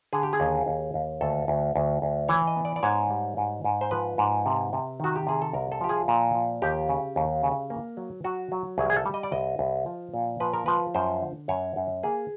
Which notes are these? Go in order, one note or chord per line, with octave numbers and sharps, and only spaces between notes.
D3 G#4
G4
G#4
D#2
D#2
D#2
D2 A4
D2
D2
D2
E3 C#5
D#5
B3
D5
D5
G#2 C#5
G3
G#2
G#2
C5
F3 B4
G#2
C3
C3
D#3 F#4
G4
C3 G#4
A4
C2 A#4
A4
F3 G4
G#4
A#2
F3
D#2 G4
C#3
D#2
C#3
A#3
F#3
F#3 F#4
F#3
C2 G#4
G#4
A4
G3
D#5
D5
C2 D#5
C2
F3
A#2
F3 B4
A#4
F3 B4
F#2 C5
D3
F#2 C#5
F#2
A#3 G#4